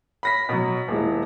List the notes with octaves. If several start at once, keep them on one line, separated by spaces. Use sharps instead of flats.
B5 A#6 B6
B2 F#3
D#1 G#3 E4